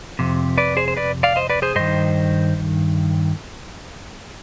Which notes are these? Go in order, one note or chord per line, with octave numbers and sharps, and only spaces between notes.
F2 C3
B4 D5
G#4 C5
C5
B4 D5
D5 F5
C5 D#5
B4 D5
G#4 C5
G2 D#3 C5 D#5